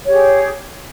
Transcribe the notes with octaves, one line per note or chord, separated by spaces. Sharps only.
G4 G#4 C#5